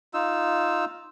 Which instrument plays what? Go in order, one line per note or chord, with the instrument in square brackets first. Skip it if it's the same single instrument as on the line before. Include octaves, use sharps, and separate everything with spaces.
[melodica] D#4 F4 E6